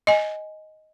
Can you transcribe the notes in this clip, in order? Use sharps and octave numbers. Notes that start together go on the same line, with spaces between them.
D#5 G#5